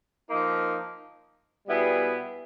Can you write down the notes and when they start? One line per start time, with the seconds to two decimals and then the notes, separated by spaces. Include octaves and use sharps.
0.29 F3 A#3 D#4
1.67 B2 G3 B3 E4 G#4